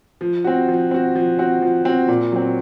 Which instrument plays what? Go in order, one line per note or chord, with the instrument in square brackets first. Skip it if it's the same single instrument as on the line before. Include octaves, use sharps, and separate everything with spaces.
[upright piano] F3
C4 F#4
F3
C4 F#4
F3
C4 F#4
F3
C4 F#4
A#2
F#3 C4